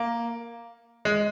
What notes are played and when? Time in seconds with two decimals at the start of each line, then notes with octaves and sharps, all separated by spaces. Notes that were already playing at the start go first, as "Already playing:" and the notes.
Already playing: A#3
1.05 G#3